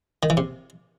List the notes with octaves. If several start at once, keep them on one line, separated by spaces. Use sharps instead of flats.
D#3
E3
C3